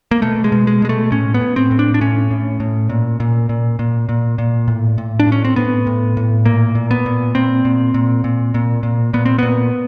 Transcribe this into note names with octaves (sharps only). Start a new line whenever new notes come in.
A#3
B2 A3
G#3
B2
G#3
B2 G#3
A3
A2 C#4
B3
A2
C4
A2
D4
D4
A2 C#4
A2
A2
A#2
A#2
A#2
A#2
A#2
A#2
A2
A2
D4
A2
C#4
C4
A2 B3
A2
A2
A#2 A#3
A#2
B3
A#2
A#2 C4
A#2
A#2
A#2
A#2
A#2
A#2 B3
C4
A#2 B3